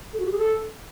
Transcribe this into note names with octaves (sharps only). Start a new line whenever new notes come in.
A4
F#4
G4
G#4
A4